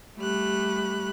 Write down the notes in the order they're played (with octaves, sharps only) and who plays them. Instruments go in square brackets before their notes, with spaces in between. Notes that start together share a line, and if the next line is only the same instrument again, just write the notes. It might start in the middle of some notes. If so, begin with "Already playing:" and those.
[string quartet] G3 A3 G4 B5 F#6